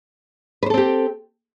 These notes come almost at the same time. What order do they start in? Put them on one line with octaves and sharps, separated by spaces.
B4 C5 A4 C4 G4